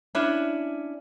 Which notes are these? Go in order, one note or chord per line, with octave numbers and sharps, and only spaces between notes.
C#4 D4 E4